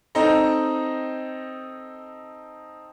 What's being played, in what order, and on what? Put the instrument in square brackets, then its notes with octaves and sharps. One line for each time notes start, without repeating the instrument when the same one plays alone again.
[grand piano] C4 D#4 A4 D#5 A#5